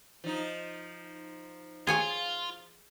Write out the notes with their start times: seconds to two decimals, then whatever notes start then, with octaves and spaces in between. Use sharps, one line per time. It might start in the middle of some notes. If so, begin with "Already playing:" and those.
0.24 F3 D#4
1.87 F4 G#4 C#5 G#5